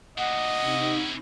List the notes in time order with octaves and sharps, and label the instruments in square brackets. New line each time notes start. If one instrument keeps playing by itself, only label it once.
[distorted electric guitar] D2 A#2 [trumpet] D#5 [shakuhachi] F#5
[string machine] C3 D#4 A#6 [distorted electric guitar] C#4 E4